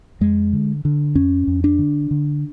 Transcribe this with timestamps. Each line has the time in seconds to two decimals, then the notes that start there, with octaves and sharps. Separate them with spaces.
0.21 F2 G#3
0.53 D3
0.85 D3
1.15 F2 C#4
1.47 F2
1.64 D4
1.79 D3
2.11 D3